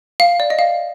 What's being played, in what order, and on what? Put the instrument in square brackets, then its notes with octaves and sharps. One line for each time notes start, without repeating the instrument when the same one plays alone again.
[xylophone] F5
D5
D#5
F5